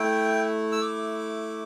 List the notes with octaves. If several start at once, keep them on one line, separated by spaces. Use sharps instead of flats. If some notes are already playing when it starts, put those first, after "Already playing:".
Already playing: A3 E4 G5
E6
D6